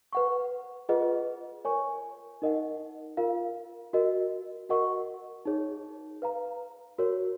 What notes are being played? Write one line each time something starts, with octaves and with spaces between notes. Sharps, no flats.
B4 F#5 C#6
F4 G#4 B4 D#5 F#5
A#4 C#5 G#5 C#6
D#4 A#4 D#5 F#5
F4 A#4 F5
F#4 A#4 D#5
F#4 A#4 D#5 F#5 C#6
D#4 G#4 C#5
B4 F5 A#5
F#4 A#4 C#5